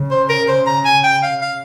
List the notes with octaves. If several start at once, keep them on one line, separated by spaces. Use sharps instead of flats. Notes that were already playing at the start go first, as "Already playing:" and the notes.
Already playing: C#3
C5
A#4
C5
A#5
G#5
G5
F5
F5